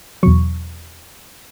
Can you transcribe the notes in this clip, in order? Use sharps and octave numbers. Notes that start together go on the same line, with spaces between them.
E2 B2 F#3 C#6